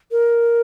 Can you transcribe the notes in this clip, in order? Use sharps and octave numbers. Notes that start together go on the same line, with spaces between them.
A#4